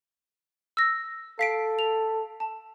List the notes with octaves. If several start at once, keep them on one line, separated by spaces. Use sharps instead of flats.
E6 A#6
A4 F5 B6 D7
F7
A5